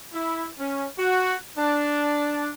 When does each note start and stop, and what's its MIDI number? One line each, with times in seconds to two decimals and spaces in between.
0.13 0.46 64
0.59 0.86 61
0.99 1.34 66
1.58 2.51 62